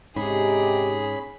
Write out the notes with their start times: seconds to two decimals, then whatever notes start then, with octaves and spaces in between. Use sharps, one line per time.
0.16 G#2 C3 C#4 D#4 G4 G#4 B5